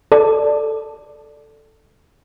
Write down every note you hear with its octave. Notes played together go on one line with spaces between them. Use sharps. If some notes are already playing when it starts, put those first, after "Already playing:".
A4 D5